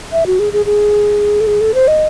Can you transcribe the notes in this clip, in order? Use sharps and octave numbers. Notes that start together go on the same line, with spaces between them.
E5
F#4
G#4
G#4
G#4
A4
G#4
A4
C5
D#5